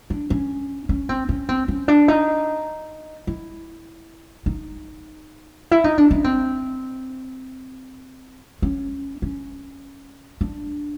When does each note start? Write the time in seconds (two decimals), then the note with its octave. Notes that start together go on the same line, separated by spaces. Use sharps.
0.10 D4
0.30 C#4
0.89 C#4
1.09 C4
1.29 C#4
1.49 C4
1.68 C#4
1.88 D4
2.08 D#4
3.27 E4
4.46 D#4
5.71 E4
5.84 D#4
5.98 D4
6.11 C#4
6.24 C4
8.62 C#4
9.22 C#4
10.41 D4